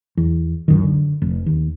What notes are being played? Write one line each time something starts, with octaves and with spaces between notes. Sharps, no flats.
E2
C#2 F#2 D#3
D3
F1
D#2